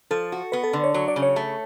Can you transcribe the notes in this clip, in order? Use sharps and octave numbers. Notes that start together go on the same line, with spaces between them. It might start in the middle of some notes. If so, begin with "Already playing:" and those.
F3 A4
F#4
B3 B4
A4
D3
C#5
F#3 C#5
D5
C#3
C#5
A3